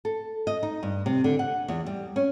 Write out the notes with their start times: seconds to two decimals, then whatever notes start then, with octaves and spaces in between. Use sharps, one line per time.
0.05 A4
0.47 D#5
0.63 D#4
0.83 G2
1.06 C3
1.24 D3
1.39 F#5
1.68 E2
1.86 G3
2.16 C#4